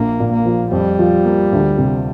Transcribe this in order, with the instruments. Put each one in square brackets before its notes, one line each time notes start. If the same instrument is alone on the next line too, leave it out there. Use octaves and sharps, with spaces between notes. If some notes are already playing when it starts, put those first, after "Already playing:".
Already playing: [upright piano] A#1 [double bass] A#3
[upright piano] A#2
[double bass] A#3
[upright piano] F3
[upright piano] F2 [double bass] G3
[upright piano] F3
A#3
D2
C3